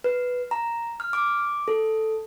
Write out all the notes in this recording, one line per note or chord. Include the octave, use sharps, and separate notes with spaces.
B4
A#5
F6
D6
A4